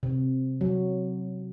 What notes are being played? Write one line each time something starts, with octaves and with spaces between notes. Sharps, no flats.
C3
F#3